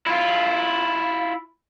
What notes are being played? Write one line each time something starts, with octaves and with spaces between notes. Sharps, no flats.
E4 F4